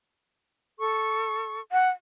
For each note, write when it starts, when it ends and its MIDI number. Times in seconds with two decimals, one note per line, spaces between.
0.79 1.60 69
0.79 1.60 85
1.72 1.89 78